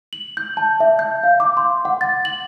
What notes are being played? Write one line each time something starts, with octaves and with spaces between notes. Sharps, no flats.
F#7
G6
A5
E5
G6
F5
D6
C6
F#5
A6
F#7